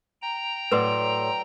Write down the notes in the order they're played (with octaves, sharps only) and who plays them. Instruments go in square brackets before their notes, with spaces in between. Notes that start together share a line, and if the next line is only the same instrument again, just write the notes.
[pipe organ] G5 A#5
[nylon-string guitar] A2 F#3 B3 [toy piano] B4 [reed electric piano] D5 C6 E6